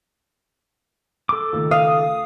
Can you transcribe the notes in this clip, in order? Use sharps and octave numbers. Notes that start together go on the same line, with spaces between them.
A4 D6
C#2 D#3 A3
F5 D#6